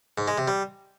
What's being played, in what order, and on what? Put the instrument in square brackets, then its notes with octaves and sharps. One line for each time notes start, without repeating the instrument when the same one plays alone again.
[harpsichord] G#2
G#3
C3
G3